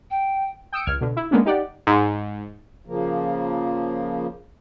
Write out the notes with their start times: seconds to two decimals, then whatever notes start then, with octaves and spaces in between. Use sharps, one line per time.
0.11 G5
0.72 G5 D#6 E6 C#7 D7
0.86 C#2 F6 G#6
1.01 B2 D3
1.17 E4
1.31 G#3 A#3 B3 C#4 D4
1.46 D#4 G4 D5 F#5
1.87 G#2
2.86 C#3 F3 A#3